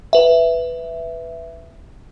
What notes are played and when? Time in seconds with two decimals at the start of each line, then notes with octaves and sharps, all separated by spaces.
0.13 B4 E5